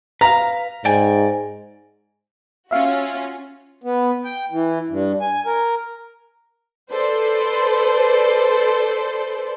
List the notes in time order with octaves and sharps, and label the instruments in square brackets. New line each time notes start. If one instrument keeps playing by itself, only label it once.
[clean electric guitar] B4 F5 [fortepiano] A#5
[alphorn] G#2 [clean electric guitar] D5 G5 G#5
[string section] C#4 F4 F#4 [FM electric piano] E5 F5
[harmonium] B3
G5
E3
G2
G#5
A#4
[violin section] A4 B4 C5 D5 C6